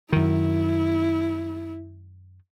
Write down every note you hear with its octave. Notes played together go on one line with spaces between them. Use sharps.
F#2 D#3 E4